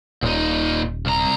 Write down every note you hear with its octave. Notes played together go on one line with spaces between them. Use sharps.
D#1 A#2 D#4
C2 A#5